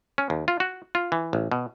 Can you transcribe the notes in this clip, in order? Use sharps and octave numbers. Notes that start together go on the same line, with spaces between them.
C#4
D#2
F4
F#4
F4
E3
A1
B2